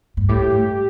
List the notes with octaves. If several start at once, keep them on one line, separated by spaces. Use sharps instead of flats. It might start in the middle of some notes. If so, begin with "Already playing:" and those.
G2
A2 G4
G2